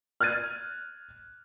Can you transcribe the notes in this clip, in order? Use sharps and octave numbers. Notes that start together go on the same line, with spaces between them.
F6 F#6 G#6 A6 D#7